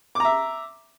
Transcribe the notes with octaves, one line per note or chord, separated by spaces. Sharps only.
E5 A#5 D6